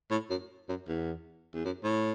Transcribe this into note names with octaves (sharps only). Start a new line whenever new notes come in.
A2
F#2
F#2
E2
E2
F#2
A2